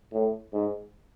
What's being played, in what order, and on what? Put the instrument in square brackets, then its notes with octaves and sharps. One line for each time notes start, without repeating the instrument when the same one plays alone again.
[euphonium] A2
G#2